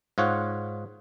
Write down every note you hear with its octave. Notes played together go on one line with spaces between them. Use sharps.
G#2 F4 C#5 F#5